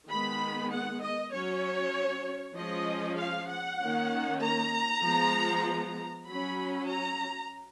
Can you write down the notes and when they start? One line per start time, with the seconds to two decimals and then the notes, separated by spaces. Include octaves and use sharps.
0.09 D#3 G#3 B3 B5
0.71 F#5
1.02 D#5
1.33 F#3 C#4 C#5
2.56 F3 G#3 C#4 D#5
3.18 F5
3.49 F#5
3.80 D#3 A#3 C#4
4.41 A#5
5.03 F3 G#3 B3
6.26 F#3 C#4 B5
6.88 A#5